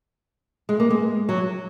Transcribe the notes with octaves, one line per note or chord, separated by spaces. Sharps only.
G#3
A#3
G#3
F#3